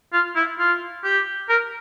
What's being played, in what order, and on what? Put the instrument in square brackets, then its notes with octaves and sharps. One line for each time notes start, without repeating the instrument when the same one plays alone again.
[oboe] F4
E4
F4
G4
A#4